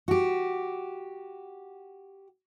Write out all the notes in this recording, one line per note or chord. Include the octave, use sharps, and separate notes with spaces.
F#4 G4